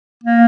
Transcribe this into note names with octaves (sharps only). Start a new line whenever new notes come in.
A#3